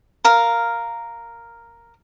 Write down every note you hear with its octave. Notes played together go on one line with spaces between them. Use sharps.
A#4 F5